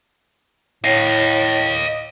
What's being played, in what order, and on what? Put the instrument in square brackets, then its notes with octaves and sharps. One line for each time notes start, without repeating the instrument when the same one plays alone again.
[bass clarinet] A2 [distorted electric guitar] D#5 F5